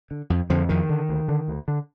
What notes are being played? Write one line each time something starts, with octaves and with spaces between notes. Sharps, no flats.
D3
F2
F2 D3 F3
F2 D#3
D3
D2
D3
D2
D3